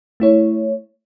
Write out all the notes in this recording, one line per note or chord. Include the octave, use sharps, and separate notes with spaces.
A3 E4 C#5